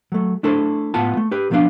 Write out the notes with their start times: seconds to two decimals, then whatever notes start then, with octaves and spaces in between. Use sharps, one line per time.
0.12 F#3 A3
0.43 A3 D4 E4 A4 C5
0.94 A2 B3 F4 F#5 A5
1.17 A3
1.31 G4 B4
1.50 B1 F3 B3 C4 D4 F5